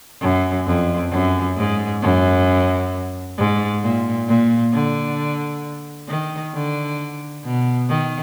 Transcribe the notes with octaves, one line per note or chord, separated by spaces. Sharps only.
F#2
F2
F#2
G#2
F#2
G#2
A#2
A#2
D3
D#3
D3
B2
D#3